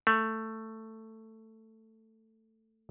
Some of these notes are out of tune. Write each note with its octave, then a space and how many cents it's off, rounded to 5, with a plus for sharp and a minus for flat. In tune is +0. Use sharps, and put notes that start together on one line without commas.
A3 +10